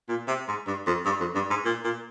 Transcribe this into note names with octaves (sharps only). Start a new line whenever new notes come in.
A#2
C3
G#2
G2
F2
G2
F2
G2
G#2
A#2
A#2